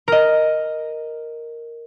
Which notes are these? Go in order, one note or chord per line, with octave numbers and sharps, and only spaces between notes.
A#4 D#5